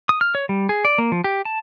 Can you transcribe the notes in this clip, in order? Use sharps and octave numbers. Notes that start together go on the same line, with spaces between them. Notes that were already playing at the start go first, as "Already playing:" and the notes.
D#6
F6
C#5
G3
G#4
D5
A#3
F3
G4
A5